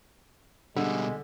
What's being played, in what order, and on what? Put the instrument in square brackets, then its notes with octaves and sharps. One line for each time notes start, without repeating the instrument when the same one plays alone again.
[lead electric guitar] B2 G3 [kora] D3 [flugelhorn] G#3